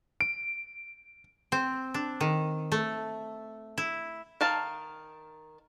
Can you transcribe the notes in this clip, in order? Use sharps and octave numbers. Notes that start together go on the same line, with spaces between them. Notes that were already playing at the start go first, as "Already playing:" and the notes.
D7
C4
D4
D#3
A3
E4
D#3 F5 A5